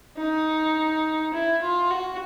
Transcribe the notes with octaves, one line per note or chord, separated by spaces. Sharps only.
D#4
E4
F4
F#4